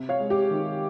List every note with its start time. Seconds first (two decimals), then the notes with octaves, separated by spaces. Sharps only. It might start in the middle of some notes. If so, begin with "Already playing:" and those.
Already playing: C3
0.09 C#5 F5
0.20 G#3
0.30 G4
0.51 D#3